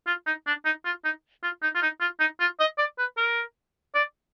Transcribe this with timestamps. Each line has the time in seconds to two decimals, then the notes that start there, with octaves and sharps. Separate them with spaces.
0.07 F4
0.26 D#4
0.47 D4
0.65 D#4
0.85 F4
1.04 D#4
1.43 F4
1.63 D#4
1.75 F4
1.82 D#4
2.01 F4
2.20 D#4
2.40 F4
2.60 D#5
2.78 D5
2.99 B4
3.17 A#4
3.95 D5